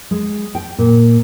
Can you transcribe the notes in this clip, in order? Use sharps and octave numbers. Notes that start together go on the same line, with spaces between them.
G#3
G5
A#2